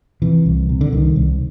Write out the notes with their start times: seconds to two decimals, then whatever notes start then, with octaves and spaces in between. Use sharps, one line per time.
0.22 C3 E3
0.46 C2
0.69 C3
0.81 D3
0.92 C2 D#3
1.16 C2